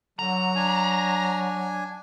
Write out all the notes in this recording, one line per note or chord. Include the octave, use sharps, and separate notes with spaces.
D3 F#3 A#5
D4 G#5